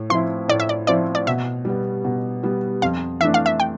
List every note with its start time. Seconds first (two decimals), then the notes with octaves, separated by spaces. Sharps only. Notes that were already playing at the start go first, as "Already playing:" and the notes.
Already playing: A2
0.10 F3 C4 E4 C6
0.48 A2 D5
0.60 E5
0.69 D5
0.87 F3 C4 E4 D5
1.15 D5
1.27 B2 E5
1.65 G3 B3
2.04 B2
2.43 G3 B3
2.82 F2 F5
3.21 E3 A3 D4 E5
3.34 F5
3.46 E5
3.60 G5